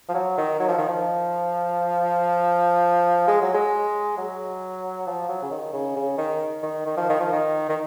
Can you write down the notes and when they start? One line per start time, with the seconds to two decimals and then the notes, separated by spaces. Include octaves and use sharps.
0.09 F3
0.14 F#3
0.38 D#3
0.60 F#3
0.69 F3
0.79 D#3
0.89 F3
3.27 G#3
3.42 F#3
3.54 G#3
4.17 F#3
5.07 F3
5.29 F#3
5.43 C#3
5.51 D#3
5.73 C#3
5.96 C#3
6.18 D#3
6.63 D#3
6.86 D#3
6.97 F3
7.09 D#3
7.20 F3
7.32 D#3
7.69 D#3